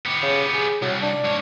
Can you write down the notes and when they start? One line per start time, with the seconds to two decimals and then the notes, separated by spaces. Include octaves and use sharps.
0.06 B3 G4
0.23 C#3
0.54 G#4
0.82 C2 F#3
1.03 D4
1.24 G#2 C#5